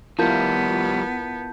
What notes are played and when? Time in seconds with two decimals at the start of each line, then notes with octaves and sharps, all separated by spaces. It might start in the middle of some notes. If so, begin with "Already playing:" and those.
0.19 F3 G3 B3 E4 F4 A#4 A5 G6